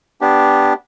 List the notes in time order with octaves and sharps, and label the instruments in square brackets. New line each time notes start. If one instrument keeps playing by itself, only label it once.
[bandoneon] B3 D4 G4